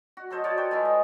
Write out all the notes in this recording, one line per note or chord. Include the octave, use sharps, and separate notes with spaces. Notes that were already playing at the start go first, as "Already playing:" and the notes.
F#4
F#3 A4 C5 D#5
F4 C#5 D5 A5
B4 C#5 G5
G#3 E4
D#5